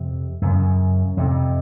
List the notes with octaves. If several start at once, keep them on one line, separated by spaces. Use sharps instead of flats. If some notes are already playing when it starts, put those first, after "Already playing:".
Already playing: F2 C3
F#2 C#3
F2 C3